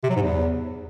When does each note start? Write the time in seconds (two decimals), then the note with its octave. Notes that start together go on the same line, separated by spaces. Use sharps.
0.03 C3
0.10 F#3
0.16 G#2
0.22 E2